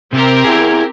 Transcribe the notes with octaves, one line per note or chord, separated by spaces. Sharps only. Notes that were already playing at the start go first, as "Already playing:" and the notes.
C3 C4 G4 A#4
E4 G#4